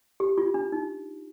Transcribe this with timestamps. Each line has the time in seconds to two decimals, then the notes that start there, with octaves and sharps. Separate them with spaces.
0.20 G4
0.38 F4
0.54 D4
0.72 D#4